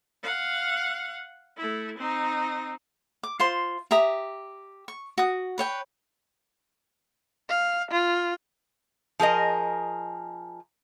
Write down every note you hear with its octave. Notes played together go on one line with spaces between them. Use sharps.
F5 F#5
A3 E4
C4 D#4
D6
F4 C5 C6
G4 E5 A#5 D#6
C#6
F#4 D#6
B4 C#5 G5
F5
F4
F3 G#4 A#4 D#5